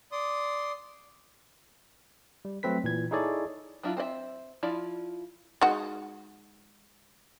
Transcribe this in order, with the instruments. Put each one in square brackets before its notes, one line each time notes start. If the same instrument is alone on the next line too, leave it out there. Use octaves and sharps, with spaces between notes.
[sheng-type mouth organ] D5 C6 D#6
[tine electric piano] G3
F#3 A3 C4 B4 B6
A#2 E3 G#6
D#4 E4 G#4 A4 C#5 D5
[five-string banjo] F#3 D4 E4 F4
C4 C5 D5 E5
F3 E4 F4 D5
[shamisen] G#3 D#4 F#4